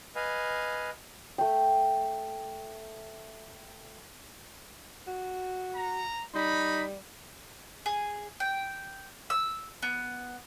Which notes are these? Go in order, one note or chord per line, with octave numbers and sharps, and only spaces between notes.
B4 D#5 F5 G#5
A3 G5
F#4
A#5
G3 D#4 B5
G#4
G5
E6
B3